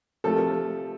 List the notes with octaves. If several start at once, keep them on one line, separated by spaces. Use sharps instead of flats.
C3 F3 A3 A4